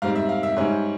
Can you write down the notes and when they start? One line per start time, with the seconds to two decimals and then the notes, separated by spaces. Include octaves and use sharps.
0.02 G#2 G3 C4 F5
0.16 E5
0.29 F5
0.43 E5
0.56 G#2 G3 C#4